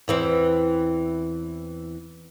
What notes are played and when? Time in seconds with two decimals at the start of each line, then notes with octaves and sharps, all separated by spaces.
0.08 E2 E3 C4